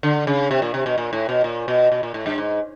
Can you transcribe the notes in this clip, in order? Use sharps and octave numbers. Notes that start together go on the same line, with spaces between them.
D3
C#3
C3
A#2
C3
B2
A#2
A2
B2
A#2
B2
B2
A#2
A2
G2
G#2